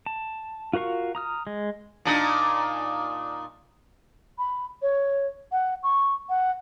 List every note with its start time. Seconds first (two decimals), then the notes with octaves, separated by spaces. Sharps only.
0.06 A5
0.73 F4 F#4 A#4 F5 C#6
1.15 A#5 D#6 F6
1.47 G#3
2.05 A#2 D4 D#4
4.38 B5
4.82 C#5
5.52 F#5
5.83 C#6
6.29 F#5